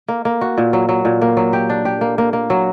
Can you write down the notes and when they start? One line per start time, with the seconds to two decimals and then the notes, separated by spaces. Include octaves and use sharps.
0.08 A#3
0.25 A#3
0.41 F#4
0.58 A#2
0.73 F#3
0.89 F#3
1.05 A#2
1.21 A#3
1.37 F#3
1.53 G4
1.70 D4
1.85 G4
2.01 A#3
2.18 A#3
2.33 A#3
2.50 F#3